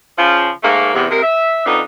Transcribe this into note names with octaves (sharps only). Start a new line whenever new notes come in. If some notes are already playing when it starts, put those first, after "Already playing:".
C#3 F3
G#2 A3 A#3
E2 C3
C3 G#3 A#3 A#4
E5
F2 B3 D4 D#4